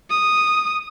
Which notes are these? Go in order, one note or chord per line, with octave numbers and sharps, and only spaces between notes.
D#6